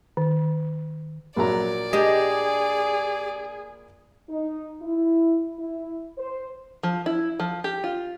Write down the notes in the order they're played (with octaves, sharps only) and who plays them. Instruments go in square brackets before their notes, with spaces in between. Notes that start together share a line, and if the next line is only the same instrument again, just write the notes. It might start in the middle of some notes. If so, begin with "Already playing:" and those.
[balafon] D#3
[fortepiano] A#1 F#3 A#5 [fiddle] D5
[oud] D4 G4 D#5 [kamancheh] G#4
[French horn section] D#4
E4
E4
C5
[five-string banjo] F3
E4
F3
G4
F4